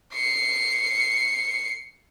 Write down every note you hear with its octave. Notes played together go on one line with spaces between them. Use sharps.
C7 C#7